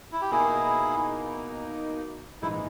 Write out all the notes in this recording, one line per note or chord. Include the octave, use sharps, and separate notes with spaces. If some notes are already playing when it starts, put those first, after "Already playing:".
E4
G4
B2 A#3 D#4 E4 G#4
A#1 G#2 E3 G#3 D#4 E4